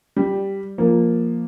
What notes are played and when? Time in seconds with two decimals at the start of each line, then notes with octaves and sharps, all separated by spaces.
0.16 G3
0.78 F3 A#3